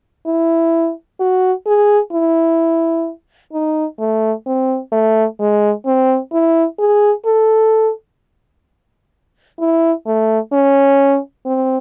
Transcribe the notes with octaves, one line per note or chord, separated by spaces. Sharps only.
E4
F#4
G#4
E4
D#4
A3
C4
A3
G#3
C4
E4
G#4
A4
E4
A3
C#4
C4